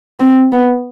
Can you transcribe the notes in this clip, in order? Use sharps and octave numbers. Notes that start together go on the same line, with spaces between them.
C4
B3